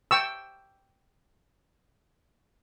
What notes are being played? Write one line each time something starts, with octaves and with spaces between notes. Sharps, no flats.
G5 C#6 E6